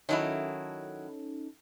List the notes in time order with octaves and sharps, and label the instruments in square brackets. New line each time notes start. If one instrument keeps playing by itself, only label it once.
[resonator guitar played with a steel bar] D#3 F#3 E4 [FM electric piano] C#4 D#4 A4